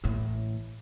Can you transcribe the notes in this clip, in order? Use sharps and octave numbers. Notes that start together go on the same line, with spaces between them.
A1 A2